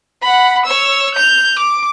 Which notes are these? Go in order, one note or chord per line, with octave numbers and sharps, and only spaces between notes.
F#5 B5
C#5 E6
G6 F7
D6